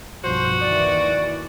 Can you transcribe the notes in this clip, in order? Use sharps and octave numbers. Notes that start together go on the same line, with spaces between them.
B1 G2 F3 F#4 C5
D#2 D#3 E3 D5